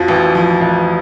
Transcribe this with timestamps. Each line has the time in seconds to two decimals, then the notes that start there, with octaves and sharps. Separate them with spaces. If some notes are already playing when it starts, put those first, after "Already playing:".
Already playing: F2 F3 F#4
0.08 A1
0.35 F3
0.61 A1